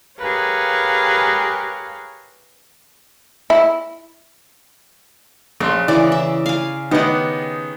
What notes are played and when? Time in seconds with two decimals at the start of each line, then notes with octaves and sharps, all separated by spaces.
0.19 G4 G#4 A#4 B4 C#5 F5
3.50 E4
5.60 A#1 C#4 C6
5.88 C#3 E3 D5
6.12 E5
6.46 F5 G#5
6.91 D#3 B3 D#4 G4 F#5